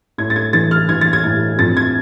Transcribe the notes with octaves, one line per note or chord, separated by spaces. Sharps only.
A2 G#6
A6
G#6
E3 A6
F6
E3 G#6
A6
G#6
A2
F2 A6
G#6